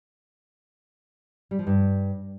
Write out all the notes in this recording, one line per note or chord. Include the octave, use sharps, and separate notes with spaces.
G3
F3
G2